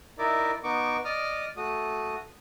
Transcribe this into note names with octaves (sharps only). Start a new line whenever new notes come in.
D#4 E4 A#4 D5 E5
B3 D#4 C#6 D6
D5 D#5 D#6 F6
A3 F#4 D#6